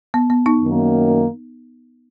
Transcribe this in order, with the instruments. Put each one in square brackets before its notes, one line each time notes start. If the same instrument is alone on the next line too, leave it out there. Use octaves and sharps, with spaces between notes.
[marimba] B3
B3
B3 D#4
[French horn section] F#2 D#3 A#3